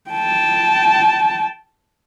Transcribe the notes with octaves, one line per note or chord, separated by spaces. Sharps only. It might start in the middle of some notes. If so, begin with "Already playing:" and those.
G5 A5